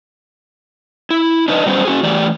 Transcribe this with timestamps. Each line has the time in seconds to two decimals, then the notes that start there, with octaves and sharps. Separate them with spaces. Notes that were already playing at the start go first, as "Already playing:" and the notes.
1.10 E4
1.48 D4 D#4 B4 D5 D#5
1.66 F#3 G3 B3 C#4 C5
1.85 C#4 F#4 G#4
2.03 E3 A3 G4 D5